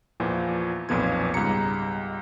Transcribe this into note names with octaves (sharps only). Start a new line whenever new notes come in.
E2 A#2 E3 F3
B1 F2 A#2 B3 F4 G#6
C#2 G#2 G3 A#5 C#7